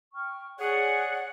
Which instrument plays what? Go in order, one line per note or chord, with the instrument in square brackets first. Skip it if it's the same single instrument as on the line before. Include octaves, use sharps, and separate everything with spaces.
[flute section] G5 C#6 F6
[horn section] G#4 C#5 [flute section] D5 F#6 [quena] F#5